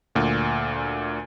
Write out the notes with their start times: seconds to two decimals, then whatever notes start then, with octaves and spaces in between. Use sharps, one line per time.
0.15 D2 A#2